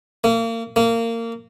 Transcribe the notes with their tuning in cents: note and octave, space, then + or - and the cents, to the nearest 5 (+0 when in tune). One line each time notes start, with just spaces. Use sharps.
A#3 -35
A#3 -25